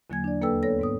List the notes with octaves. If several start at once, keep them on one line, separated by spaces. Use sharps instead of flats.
E2 D3 F#3 A#3 G#5 G#6
D4 D5
D#2 A#3 A4 B4 G5 E6
B3 A4 C#5 A#6
G#2 B3 D#6